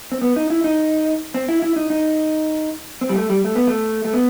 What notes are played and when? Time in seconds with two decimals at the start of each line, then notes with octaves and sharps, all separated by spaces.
0.12 C4
0.21 B3
0.36 D#4
0.50 E4
0.64 D#4
1.34 C4
1.49 E4
1.62 E4
1.76 D#4
1.90 D#4
3.01 C4
3.09 G3
3.16 A3
3.30 G3
3.45 A3
3.55 B3
3.67 A3
4.05 A3
4.14 B3